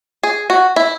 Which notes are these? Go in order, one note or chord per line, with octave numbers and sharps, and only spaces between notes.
G#4
F#4
E4